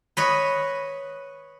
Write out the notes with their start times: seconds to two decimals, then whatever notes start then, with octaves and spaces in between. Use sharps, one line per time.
0.17 B4 C#5 D#5